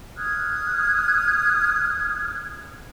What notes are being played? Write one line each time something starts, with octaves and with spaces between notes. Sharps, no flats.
D#6 F6 F#6 G#6